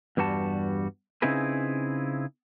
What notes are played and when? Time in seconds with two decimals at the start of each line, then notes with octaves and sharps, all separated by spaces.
0.17 E2 G2 G3 F#4 A5
1.22 C#3 C4 D#4 E4 G#4 B4